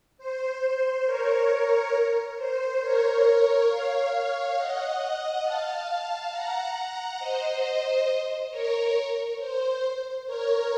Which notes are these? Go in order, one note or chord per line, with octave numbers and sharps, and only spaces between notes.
C5
A#4 C#5
C5
A#4 C#5
C#5 F5
D#5 F#5
F5 A5
F#5 A#5
F#5 A#5
C5 D#5
A#4 C#5
C5
A#4 C#5